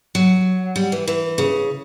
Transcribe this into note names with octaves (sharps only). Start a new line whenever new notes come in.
F#3
G3
E3
E3
C#3